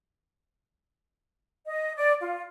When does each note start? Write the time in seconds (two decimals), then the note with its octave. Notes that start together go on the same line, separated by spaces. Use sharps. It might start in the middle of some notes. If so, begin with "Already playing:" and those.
1.67 D#5
1.95 D5
2.21 F4